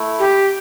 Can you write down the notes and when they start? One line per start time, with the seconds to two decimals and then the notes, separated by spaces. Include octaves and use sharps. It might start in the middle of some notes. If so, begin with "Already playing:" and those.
Already playing: A3 E4
0.19 G4